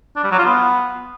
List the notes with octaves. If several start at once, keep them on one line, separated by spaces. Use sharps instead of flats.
D4
G3
F#3
F4
B3